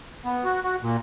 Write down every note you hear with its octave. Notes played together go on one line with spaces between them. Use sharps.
B3
F#4
F#4
A#2